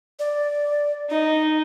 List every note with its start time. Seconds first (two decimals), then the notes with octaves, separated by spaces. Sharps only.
0.19 D5
1.10 D#4 D#5